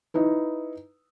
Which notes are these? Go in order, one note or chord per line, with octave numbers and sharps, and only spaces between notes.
D#4 E4 B4